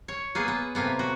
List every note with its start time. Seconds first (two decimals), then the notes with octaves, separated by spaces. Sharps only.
0.08 C#5
0.35 A#3 B3 G#4
0.48 B3
0.75 A2 C3 A#3 B3
0.99 F#4